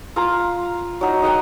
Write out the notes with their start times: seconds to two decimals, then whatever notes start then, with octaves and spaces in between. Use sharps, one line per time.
0.16 F4 F5 A#5
1.01 F#3 D#4
1.22 D#4 D#5 F#5 G5